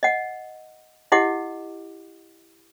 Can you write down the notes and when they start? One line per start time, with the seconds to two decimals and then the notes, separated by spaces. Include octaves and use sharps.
0.03 D#5 F#5
1.12 E4 G4 D#5 F#5 D6